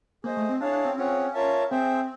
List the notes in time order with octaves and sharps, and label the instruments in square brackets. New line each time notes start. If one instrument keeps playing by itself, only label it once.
[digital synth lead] A#3 [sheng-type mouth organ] G#4 C5 D#5
[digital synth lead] A3
C4
[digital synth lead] D4 [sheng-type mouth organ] E4 G#4 C#5 F5 A5
[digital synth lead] D4
C4
[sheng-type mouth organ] C4 F4 G#4 C#5 F#5 [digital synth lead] C#4
[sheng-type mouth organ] F4 A#4 C#5 E5 A5
[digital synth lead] C4 [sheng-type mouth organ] G#4 C5 E5 G5